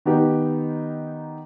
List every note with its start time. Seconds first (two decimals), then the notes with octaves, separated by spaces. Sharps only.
0.05 D#3 B3 D#4 G4